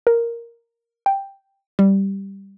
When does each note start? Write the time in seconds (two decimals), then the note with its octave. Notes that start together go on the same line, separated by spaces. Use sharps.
0.07 A#4
1.06 G5
1.79 G3